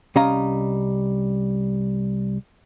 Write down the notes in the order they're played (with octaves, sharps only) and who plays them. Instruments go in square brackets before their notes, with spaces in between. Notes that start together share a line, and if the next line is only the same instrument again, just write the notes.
[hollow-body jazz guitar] C2 G3 C#4 D#5 F5 A#5